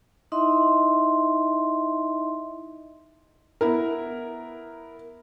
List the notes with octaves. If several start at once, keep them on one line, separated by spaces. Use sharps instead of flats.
D#4 E4 D#5 E5 C6
B3 E4 A#4